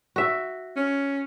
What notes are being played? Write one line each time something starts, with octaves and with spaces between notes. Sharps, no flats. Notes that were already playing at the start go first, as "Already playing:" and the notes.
F#4 E5
C#4